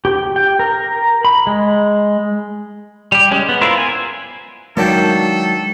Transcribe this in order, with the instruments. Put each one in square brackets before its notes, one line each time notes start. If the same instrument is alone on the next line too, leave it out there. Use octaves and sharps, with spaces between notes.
[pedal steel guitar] G4
G5
A#4
B5
G#3
G3 G4
G3 G#3 C#4
B3
E4 F4 A#4 C5 E5
G#5
[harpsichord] D#3 F#3 D4 [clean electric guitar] G#3 F5 G5 [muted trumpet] A4